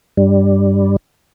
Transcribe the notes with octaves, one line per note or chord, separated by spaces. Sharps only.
G2 G3